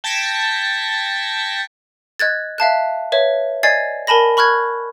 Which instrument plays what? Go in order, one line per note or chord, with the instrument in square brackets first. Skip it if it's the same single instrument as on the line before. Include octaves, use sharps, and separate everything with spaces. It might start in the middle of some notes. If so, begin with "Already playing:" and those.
[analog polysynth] G5 A5 G#6 A#6 B6 C#7
[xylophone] D#5 F#6 G#6 A6
E5 F5 A5 F#6
B4 C#5 E5
D5 D#5 G#5 G#6 A6 C7
A#4 G#5 A5 B5 A#6
B5 C#6 F6 F#6 G#6